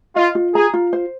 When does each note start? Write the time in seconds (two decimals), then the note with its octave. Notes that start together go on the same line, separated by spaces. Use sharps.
0.16 F4 D#5
0.35 F4
0.55 G#4 A#5
0.74 F4
0.93 C5